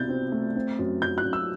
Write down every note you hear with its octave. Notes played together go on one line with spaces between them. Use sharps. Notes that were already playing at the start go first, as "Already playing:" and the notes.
Already playing: C2 B2 G6 A6
C4
A3
C4
F#2
F#2 G6
F#6
F#2
E6